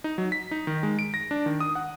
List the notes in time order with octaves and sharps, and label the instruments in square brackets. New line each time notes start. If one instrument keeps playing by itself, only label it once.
[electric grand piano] D#4
F#3
B6
D#4
D#3
G#3
D7
A#6
D4
D#3
D#6
F#5